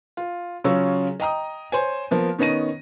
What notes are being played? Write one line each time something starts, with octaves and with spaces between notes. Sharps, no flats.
F4
C#3 F#3 C#4 F4 C#5 E6
D#5 G5 A#5 D#6
C5 C#5 G#5
F3 A#3 B3
D#3 B3 C#4 D#4 A#6 D#7